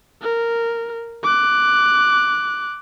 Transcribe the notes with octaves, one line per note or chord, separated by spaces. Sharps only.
A#4
D6 F#6